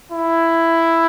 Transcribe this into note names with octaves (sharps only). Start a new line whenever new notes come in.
E4